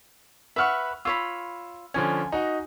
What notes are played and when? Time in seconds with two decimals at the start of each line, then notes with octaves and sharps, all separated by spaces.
0.56 B4 E5 F#5 C#6 E6 F6
1.05 F4 C#5 B5 E6
1.94 D3 F3 C#4 G#5
2.32 D#4 F#4 D#5